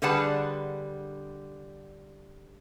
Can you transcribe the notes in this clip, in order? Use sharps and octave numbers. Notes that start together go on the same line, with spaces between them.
D3 G3 G#4 B4 F#5 A5